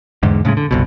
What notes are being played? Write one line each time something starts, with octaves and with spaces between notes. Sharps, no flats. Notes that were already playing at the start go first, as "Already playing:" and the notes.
E2 G#2 D3
A2 C#3 F3 G#3
D3
G1 C2 B2